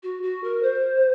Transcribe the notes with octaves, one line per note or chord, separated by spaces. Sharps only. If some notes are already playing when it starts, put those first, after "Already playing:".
F#4
F#4
A#4
C5